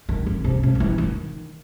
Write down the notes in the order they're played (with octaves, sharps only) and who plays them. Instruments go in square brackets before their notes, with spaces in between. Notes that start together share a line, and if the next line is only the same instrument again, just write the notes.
[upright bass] D#3
C#3
C3
C#3
D#3
E3
D#3